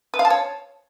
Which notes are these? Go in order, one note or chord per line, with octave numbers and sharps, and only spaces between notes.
B4
F5
A5
C#5